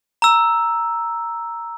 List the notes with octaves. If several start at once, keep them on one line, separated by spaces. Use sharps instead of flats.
A#5 E6